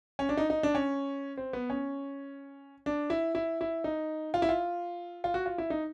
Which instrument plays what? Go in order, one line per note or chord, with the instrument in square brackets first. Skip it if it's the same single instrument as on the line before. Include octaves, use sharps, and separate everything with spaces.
[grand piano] C#4
D4
D#4
D#4
D4
C#4
C4
B3
C#4
D4
E4
E4
E4
D#4
F4
E4
F4
F4
F#4
F4
E4
D#4